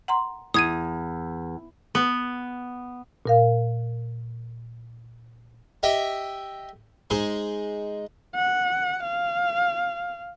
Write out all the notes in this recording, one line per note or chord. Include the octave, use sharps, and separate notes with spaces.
F#5 A#5 C6
E2 D#6 G#6 D#7
B3
A#2 A#4 F5
G4 D#5 E5 G5
G#3 D#4 G#4 C5
F#5
F5